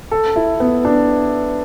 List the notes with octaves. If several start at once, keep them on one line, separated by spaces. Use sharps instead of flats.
A4
E4
B3
D4